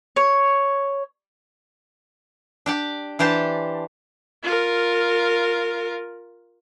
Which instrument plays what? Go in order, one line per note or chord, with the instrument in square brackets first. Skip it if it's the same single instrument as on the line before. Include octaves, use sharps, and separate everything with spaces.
[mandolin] C#5
[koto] D4 G4 D5
E3 D4 G4 C5 A5
[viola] F4 A#4